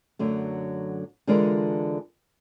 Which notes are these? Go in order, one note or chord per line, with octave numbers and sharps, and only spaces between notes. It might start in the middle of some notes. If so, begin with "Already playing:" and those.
F#2 D3 F#3 A3
D3 E3 G#3 F4 A#4 D5